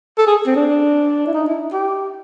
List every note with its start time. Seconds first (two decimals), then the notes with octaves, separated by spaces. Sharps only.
0.18 A4
0.28 G#4
0.47 C4
0.56 D4
1.27 E4
1.34 D#4
1.48 E4
1.73 G4